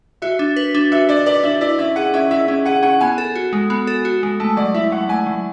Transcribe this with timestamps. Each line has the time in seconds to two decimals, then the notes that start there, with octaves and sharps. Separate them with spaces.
0.22 F#4 E5
0.39 D4
0.56 B4
0.75 D4
0.92 F#4 E5
1.09 D4 D5
1.26 B4 D5
1.44 D4 E5
1.61 E4 D5
1.78 C#4 E5
1.96 G#4 F#5
2.14 C#4 E5
2.31 E4 E5
2.48 C#4 E5
2.66 G#4 F#5
2.83 C#4 F#5
3.01 B3 G#5
3.18 A4
3.35 F#4
3.53 G#3
3.70 B3
3.87 A4
4.05 F#4
4.23 G#3
4.40 A3 A5
4.57 F#3 D5
4.74 E4 E5
4.92 F#3 F#5
5.09 A3 G#5
5.26 F#3